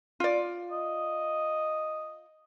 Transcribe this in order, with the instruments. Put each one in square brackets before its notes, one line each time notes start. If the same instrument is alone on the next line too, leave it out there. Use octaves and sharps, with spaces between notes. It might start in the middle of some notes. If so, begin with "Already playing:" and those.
[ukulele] F4 D5
[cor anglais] D#5